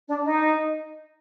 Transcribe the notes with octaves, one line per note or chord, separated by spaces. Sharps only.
D4
D#4